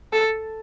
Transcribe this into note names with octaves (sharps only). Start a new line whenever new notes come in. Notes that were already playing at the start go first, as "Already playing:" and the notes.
A4